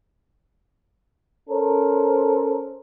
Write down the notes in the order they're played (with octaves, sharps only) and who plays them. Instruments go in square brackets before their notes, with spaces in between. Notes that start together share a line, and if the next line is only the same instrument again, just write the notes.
[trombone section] C#4 A4 A#4 C5